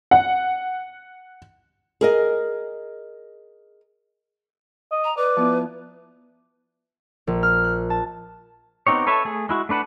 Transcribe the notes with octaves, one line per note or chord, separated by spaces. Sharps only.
F#5
G#4 A#4 D#5
D#5
A#5
B4 D5
F3 B3 E4
A#1
F6
F#6
A5
B3 C4 D#4 G4 C#5
A4 B4 C#5 E5 A5
A3 G#4
G#3 E4 F#4
A3 D4 B4 F#5 A5